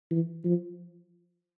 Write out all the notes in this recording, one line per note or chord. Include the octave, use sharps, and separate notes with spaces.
E3
F3